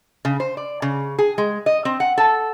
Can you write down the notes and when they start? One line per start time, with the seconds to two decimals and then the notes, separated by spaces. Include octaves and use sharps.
0.25 C#3
0.40 C5
0.57 D5
0.82 C#3
1.19 G#4
1.38 G#3
1.66 D#5
1.85 C4
2.00 F#5
2.18 A4